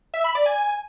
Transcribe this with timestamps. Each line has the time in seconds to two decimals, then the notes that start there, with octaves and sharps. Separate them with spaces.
0.14 E5
0.24 B5
0.35 D5
0.46 G#5